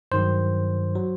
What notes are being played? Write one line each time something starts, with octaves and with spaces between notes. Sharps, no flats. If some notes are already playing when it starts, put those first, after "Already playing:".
G2 D#3 F#3 C5
F#3